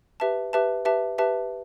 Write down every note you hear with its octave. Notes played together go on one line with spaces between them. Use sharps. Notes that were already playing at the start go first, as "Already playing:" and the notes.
G4 B4 E5 A5
G4 B4 E5 A5
G4 B4 E5 A5
G4 B4 E5 A5